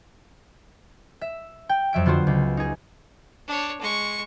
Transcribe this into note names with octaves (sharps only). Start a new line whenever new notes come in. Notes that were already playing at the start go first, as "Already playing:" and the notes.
E5
G5
F2 F#3 E5 D7
D3 B3 F4 F#4 C5
C#2
D#4 G#4
D4 C#5
G#3 C#6